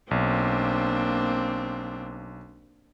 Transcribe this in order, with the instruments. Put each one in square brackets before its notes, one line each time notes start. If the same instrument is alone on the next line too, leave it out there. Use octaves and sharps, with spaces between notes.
[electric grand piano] B1 [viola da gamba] A#3 C4 D4